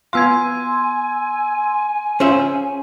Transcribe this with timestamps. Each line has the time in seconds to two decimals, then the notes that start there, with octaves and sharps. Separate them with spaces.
0.13 B3 F4 F5 G#5 C6 E6 G#6
2.20 C#4 F4 G#4 C5 E5